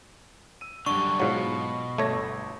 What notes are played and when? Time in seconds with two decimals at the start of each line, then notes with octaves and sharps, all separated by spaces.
0.61 E6 D#7
0.86 F#2 D3 G3 D4 C#6
1.20 G#2 B2 F#3 F4
1.98 G1 A3 C#5 E5 A#6